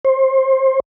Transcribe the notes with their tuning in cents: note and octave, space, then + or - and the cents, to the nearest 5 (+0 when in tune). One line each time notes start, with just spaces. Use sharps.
C5 +25